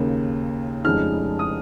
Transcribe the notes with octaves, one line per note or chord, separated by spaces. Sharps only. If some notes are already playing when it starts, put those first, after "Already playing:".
Already playing: D#2 C#3 A#3
F1 F2 C#3 G#3 D#4 F6
D#6